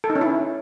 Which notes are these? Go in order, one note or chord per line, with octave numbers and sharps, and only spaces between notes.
A4
D#4
C#4
E4